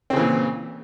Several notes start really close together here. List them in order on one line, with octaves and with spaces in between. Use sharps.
C4 C#3 E3 A#2